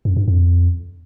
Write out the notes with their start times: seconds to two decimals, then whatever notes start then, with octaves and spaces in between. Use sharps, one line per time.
0.05 F#2
0.16 G2
0.28 F2